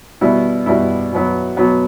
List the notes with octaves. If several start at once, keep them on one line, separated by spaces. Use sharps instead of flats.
B2 G3 B3 E4
B2 G3 B3 E4
B2 F#3 B3
B2 F#3 B3